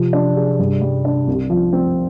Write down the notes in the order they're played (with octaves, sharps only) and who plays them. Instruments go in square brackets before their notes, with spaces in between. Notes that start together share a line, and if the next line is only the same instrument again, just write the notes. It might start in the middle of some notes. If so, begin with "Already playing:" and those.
Already playing: [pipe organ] C3 [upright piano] F3
[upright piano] D4
G#4
G2
G3
D4
C2
F3
C4